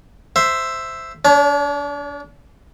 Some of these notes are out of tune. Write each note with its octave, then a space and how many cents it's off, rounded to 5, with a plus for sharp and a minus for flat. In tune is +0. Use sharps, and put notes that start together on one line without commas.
C5 +0 E5 +5
D4 -35 C#5 +25